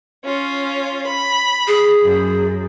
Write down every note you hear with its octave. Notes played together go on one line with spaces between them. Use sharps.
C#4 F4
B5
G#4
F#2